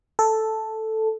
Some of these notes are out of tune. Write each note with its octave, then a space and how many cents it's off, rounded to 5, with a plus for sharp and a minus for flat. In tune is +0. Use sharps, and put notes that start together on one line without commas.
A4 +0